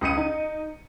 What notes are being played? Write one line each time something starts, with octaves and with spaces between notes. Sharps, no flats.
C#2 D#6 C#7 D#7
D#4